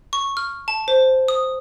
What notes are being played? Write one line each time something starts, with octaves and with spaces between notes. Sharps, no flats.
C#6
F6
A5
C5
D#6